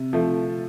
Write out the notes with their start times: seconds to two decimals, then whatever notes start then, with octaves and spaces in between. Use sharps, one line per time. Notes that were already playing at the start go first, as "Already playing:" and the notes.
Already playing: C3
0.13 F3 A3